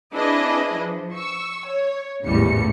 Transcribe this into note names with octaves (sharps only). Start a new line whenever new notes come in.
C4 D4 E4 G#4 B4 D#5
F3
C#6 E6
C#5
G#1 E2 A2 C#3 G3 C#7